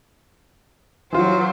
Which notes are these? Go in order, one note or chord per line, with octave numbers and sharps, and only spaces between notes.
E3 F#3 F4 C5